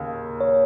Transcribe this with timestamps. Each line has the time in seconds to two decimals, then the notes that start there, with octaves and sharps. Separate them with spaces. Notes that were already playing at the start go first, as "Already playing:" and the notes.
Already playing: D#2 C#3
0.41 C#5